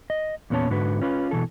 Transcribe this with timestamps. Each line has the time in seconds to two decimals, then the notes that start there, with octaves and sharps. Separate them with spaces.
0.10 D#5
0.50 E2 A#2 B3 C#4 C#5 A5
0.70 G#2 D3 F#4 B4
1.02 C#4 F4 B4
1.31 B2 E3 A4